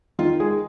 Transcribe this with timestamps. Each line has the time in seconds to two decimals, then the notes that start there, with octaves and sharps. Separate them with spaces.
0.19 D#3 F4
0.40 G#3 G#4